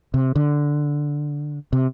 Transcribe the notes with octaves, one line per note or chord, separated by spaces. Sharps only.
C3
D3
C3